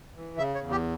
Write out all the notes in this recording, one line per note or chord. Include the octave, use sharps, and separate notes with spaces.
E3
C#3 E5
C#5
E2
G4